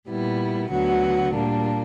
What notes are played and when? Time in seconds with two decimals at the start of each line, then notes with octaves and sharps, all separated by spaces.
0.08 A#2 G3 B3 E4
0.70 D2 D3 F#3 B3 F#4
1.34 A#2 G3 A#3 D4